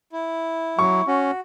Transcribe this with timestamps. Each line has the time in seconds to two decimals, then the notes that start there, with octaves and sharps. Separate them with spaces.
0.12 E4
0.79 F#3 C#6
1.08 C#4 F#4